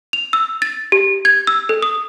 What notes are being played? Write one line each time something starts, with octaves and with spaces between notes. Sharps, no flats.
F7
E6
A6
G4
G#6
E6
A4
D#6